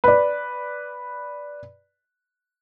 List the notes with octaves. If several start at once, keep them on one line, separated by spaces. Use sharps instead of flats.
B4 D5